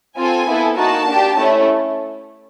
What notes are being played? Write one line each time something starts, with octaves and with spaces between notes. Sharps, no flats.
C4 F4 A4 G#5
B3 E4 A4
A#3 D#4 F#4 A5
D4 G4
A3 C#4 E4